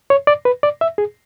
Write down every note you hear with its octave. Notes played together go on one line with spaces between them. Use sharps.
C#5
D5
B4
D5
E5
G#4